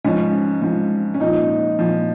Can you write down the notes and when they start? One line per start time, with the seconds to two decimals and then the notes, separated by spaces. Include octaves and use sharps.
0.04 G#2 F3 C#4
0.62 G#2 F3
1.14 C#4
1.20 A#2 F3 D#4
1.79 A#2 F3